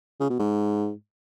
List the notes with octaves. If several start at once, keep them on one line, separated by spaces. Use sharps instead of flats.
C#3
B2
G#2